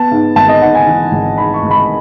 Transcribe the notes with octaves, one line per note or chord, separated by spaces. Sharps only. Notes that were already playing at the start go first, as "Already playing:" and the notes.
Already playing: B3 A5
G#2
G#1 A5
D#5
G#2 F#5
G#5
E3
G#1
G#2 B5
C#6
G#1
B5